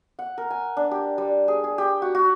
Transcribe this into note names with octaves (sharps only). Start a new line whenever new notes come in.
F#5
A#4
G#5
D4
G4
G3
G#4
G#4
G4
F#4
F#4